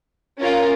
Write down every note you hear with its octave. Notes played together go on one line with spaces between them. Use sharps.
C#4 F4 A#4